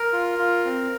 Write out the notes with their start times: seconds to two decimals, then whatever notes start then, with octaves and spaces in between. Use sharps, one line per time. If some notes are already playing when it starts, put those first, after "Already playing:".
Already playing: A#4
0.13 F4
0.39 F4
0.65 C4